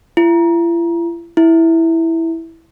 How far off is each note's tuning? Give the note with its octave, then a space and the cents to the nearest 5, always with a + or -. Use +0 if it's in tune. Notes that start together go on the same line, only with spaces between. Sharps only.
E4 +45
E4 -5